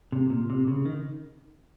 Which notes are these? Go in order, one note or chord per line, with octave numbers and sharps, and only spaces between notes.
C3
A#2
C3
C#3
D#3